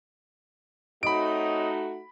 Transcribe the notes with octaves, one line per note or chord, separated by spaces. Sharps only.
A3 C4 D#4 F#4 C#5 D#5 B5 D7